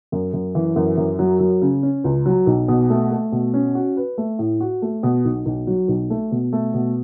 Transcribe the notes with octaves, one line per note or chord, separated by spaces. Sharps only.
F#2
F#2
E3
F#2
F#2
F#3
F#3
C#3
C#4
C#2
F#3
B1
B2
A3
A3
B2
C#4
F#4
B4
A3
A2
F#4
A3
B2
B1
B1
F#3
B1
A3
B2
A3
B2